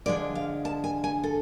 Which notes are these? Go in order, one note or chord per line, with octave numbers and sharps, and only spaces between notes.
D3 F3 G#3 D4 D5
F5
A5
G#5
G#5
A4